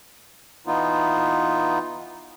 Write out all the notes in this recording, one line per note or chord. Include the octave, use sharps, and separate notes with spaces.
E3 B3 D#4 F4